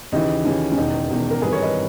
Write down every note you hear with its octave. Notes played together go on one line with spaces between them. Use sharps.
D#2 C#3 E3 D#4
D#2 C#3 E3 C#4
C#4
E1 E2 D#3 D#4
E1 E2 D#3
A#4
G#1 G2 E3 G#4 B4
A#4 C#5
B4 D#5